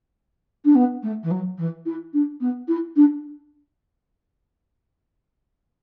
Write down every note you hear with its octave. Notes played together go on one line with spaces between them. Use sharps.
D4
B3
A3
E3
F#3
E3
E4
D4
B3
E4
D4